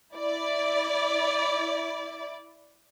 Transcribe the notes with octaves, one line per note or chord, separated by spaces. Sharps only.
E4 D5